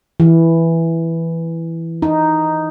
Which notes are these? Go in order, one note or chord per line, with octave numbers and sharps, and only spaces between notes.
E3
D#4